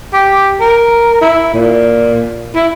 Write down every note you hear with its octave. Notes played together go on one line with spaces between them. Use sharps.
G4
A#4
E4
A#2
E4